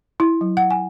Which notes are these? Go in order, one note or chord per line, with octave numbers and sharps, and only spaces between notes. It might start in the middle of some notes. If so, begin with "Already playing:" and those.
E4
F#3
F#5
G#5